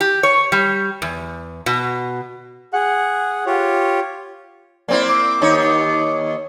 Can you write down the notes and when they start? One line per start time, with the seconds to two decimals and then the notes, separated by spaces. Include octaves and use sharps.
0.01 G4
0.23 C#5
0.52 G3
1.02 E2
1.66 B2
2.74 G#4 F#5
3.46 F4 G4 C#5
4.88 A#3 C4 E4 D5
5.08 D6
5.42 D#2 D#4 C#5
5.63 D6